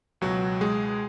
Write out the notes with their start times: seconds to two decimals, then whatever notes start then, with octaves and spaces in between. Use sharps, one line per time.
0.21 C#2 B2 F#3 F#4
0.61 G#3 G#4